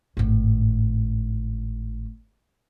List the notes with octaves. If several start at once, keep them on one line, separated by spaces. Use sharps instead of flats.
G#1 A2